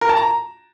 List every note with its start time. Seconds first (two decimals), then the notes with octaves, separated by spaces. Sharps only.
0.01 A#4
0.09 A5
0.17 A#5